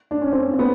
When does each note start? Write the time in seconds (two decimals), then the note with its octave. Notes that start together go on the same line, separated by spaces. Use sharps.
0.11 D4
0.21 C#4
0.32 C4
0.54 C4
0.59 B3